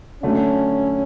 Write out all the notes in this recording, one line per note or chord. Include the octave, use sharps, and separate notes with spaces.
D3 F#3 A3 C#4